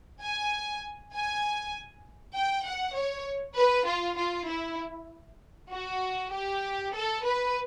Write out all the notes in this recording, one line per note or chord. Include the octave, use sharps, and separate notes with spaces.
G#5
G#5
G5
F#5
C#5
B4
F4
F4
E4
F#4
G4
A4
B4